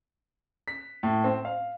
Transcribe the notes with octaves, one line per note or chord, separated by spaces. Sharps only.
B6
A2
C4
F5